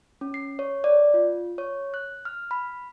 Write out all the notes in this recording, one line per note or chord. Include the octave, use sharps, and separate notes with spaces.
C#4
C7
C#5
D5
F4
C#5
F#6
F6
B5